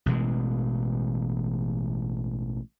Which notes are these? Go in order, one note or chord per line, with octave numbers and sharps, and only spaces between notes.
A1 B2 E3 G#3